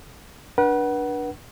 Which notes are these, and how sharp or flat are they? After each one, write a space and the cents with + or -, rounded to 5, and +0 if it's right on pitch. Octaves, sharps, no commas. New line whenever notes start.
D4 +0 B4 -35 F#5 +20